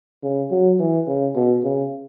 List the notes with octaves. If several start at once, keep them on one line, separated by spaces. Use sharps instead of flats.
C#3
F#3
E3
C#3
B2
C#3